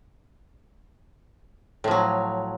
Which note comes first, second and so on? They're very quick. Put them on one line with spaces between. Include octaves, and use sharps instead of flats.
A2 F3 F#3